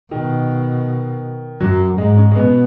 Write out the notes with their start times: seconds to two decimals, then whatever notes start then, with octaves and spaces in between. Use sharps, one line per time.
0.11 B2 D#3
1.61 F#2 F#3
1.98 G#2 G#3
2.17 C#4
2.31 G#3
2.36 B2 B3